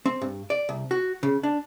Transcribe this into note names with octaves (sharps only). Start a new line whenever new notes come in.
C4
G2
D5
C2
F#4
C#3
D4